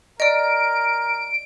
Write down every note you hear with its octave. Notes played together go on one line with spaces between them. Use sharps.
A#4 D5 D#5 D7